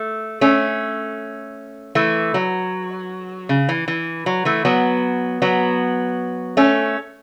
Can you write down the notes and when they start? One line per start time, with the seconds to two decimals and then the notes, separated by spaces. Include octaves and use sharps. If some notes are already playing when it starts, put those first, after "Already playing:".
Already playing: A3
0.41 A3 C#4
1.95 E3 A3
2.34 F#3
3.49 C#3
3.69 E3
3.88 E3
4.26 F#3
4.45 E3 A3
4.65 F#3 B3
5.42 F#3 B3
6.57 A3 C#4